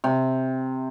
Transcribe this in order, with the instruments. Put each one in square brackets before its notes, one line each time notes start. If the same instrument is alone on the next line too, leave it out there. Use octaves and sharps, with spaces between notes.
[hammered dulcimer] C3